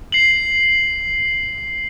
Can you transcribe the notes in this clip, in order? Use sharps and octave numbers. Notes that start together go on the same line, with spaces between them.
C7 F#7